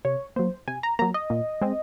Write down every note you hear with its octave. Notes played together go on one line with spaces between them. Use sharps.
C3 C#5
F#3 A#3 C5
C3 G#5
A#5
F#3 A#3 A#5
D#5
A#2
G#3 C4